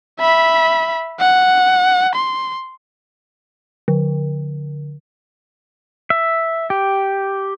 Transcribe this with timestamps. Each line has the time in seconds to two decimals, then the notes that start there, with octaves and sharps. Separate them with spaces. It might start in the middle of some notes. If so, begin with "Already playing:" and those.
0.20 E5 B5
1.20 F#5
2.15 C6
3.88 D3
6.10 E5
6.70 G4